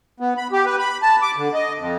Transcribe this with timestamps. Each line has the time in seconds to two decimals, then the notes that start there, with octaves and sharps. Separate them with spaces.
0.20 B3
0.37 B5
0.52 G4
0.66 B4
0.79 B5
1.02 A5
1.22 D6
1.37 D3
1.54 D#5
1.78 F2